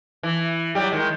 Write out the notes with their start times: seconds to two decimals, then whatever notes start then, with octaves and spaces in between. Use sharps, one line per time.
0.23 E3
0.75 F#3 G3 G4
0.91 D#3 G#3